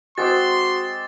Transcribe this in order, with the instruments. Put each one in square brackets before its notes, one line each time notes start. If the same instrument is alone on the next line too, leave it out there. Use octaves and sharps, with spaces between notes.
[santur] G#3 C4 D5 [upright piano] F#4 C5 [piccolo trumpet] C6 [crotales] D6 A6